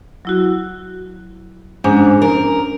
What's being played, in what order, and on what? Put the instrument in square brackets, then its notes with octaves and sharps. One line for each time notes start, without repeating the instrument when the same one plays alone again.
[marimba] F#3 E4 F#4
[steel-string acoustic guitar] G#2 [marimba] C#4 D4
[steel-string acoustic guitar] A#4